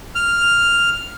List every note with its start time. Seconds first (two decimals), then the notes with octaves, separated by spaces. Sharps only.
0.15 F6